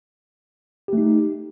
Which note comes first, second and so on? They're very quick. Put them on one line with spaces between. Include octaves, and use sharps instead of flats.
G4 A3 D#4